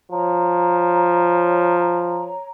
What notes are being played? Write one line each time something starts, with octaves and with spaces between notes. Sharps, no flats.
F3 C#5 A#5